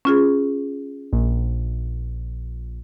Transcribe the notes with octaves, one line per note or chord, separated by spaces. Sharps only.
C#4 F4 G#4
A#1